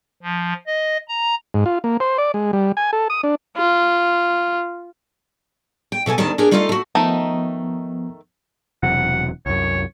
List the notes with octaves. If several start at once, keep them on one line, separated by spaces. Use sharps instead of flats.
F3
D#5
A#5
G#2
F4
A#3
C5
D5
G#3
G3
G#5
A4
D#6
D4
F4
G5
B2 A4 D#5 G#5
D2 C3 D#3 G3 A5
D4 G4 G#4 A#4
G3 A3 D#4 F4 A4 F5
A3 F#4
D#3 F3 A3 B3 D#4
E1 C3 F#3 F#5
C2 F#2 C#5